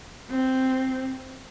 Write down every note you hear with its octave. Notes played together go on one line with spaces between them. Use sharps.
C4